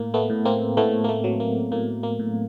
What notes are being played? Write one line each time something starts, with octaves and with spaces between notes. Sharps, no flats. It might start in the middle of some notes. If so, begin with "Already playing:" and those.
Already playing: A2 A#3
A3 B3
A2
A#3 C4
A2 A3 B3
A#3
A3
F#3
A#3
A2 A#3
A#3
A2